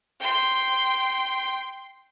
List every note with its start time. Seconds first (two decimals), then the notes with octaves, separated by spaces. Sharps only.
0.20 G5 C6